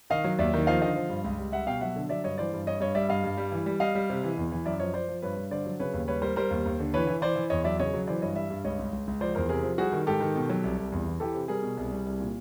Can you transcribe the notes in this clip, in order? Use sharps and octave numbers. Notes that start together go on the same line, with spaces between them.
D#3 D#5 F5
F#3
D#2 D5 E5
D#3
F3 D#5 F5
D3 D#5 F5
F3
G2
C#2
G3
G3 E5 F#5
B2 F5 G5
F#3 E5 F#5
D3
F#3 D5 E5
G2 C#5 D#5
E3 C5 D5
G2
G2 C#5 D#5
G2 C#5 D#5
G3 D5 E5
G2 D#5 F5
G2
G3
E3
G3
G3 D#5 F5
G3
C3
E3
E2
E3
F#2 D5 E5
F3 C#5 D#5
F3 C5 D5
F3
G2 B4 C#5
G2
D3 C5 D5
F#3
C#3 B4 C#5
D#2
G3 B4 C#5
G3 A#4 C5
G3 A#4 C5
D#2
D#2
D3
E3 B4 C#5
E3
E3 C5 D5
E3
E2 C#5 D#5
F#3 D5 E5
C#3 C#5 D#5
F#3
E3 C5 D5
G2 C#5 D#5
G3 D5 E5
G2
C#2 C#5 D#5
C#2
C#2
C#2
F3 C5 D5
E2 A#4 C5
C3 G#4 A#4
F3
G3 F#4 G#4
D#3
G#2 G4 A4
D#3
B2
F#3
C2
C2
E2
E3
E3 G4 A4
C3
G3 G#4 A#4
B2
C2
G3
C2
A#2